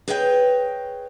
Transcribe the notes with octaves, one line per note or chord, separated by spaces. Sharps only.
G#4 B4 C#5 D#5 F5 G5